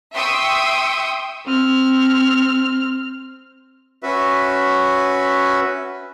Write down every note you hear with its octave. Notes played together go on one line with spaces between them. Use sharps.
E5 G5 C6 C#6 D#6 E6
C4 F6
C#4 F#4 B4 E5